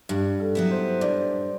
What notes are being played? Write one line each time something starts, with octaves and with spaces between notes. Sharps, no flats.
G2 G4
A4
F#3 B3 E4
C5
G2 D5